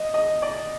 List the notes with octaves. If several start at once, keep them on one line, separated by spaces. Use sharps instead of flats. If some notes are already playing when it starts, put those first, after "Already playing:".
Already playing: D#5
D#5
D5